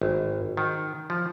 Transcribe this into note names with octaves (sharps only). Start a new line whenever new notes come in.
G#1
D#3
F3